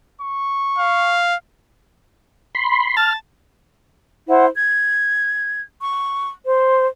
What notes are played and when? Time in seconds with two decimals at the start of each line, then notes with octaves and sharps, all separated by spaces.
0.21 C#6
0.78 F5
2.55 B5 C6
2.97 A5 F6
4.28 E4 C5 F#5
4.55 G#6
5.80 C#6
6.46 C5